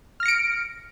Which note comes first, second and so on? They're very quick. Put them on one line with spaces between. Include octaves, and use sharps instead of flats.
F6 A#6 C#7 D7